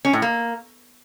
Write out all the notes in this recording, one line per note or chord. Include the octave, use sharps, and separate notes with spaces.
C#4
A2
A#3